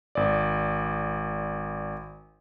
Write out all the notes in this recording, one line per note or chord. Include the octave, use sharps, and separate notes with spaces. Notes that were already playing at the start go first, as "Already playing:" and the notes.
G#1 D5